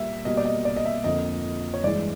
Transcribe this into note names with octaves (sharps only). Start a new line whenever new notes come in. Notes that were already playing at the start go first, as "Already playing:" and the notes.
Already playing: A#2 G3 A#3 E5
B2 G3 A#3 D#5
D5
D#5
D5
D#5
E5
F2 D3 F3 A#3 D#5
C#5
G2 E3 G#3 D5